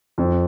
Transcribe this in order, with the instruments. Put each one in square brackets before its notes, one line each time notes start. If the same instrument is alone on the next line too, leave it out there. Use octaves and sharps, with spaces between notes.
[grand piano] F2